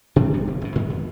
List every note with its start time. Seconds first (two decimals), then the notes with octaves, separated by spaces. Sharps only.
0.16 B2 D4
0.34 G3 A#3 B3
0.48 F1
0.61 G#1 B2
0.75 G#2 D#3 G#3 B3
0.90 F2